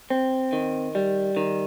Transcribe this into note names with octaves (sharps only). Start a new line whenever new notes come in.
C4
D#3
G3
D#3